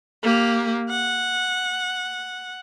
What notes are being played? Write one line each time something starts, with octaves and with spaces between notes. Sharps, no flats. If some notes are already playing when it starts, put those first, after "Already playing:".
A#3 G4
F#5